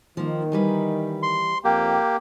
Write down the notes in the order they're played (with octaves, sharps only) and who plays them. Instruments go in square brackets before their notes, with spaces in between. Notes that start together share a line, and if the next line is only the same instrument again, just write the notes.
[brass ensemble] D#3 [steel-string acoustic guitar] F3 A#3
[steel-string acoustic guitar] E3 G3 B4
[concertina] C6
[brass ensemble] F2 G5 [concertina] A#3 G4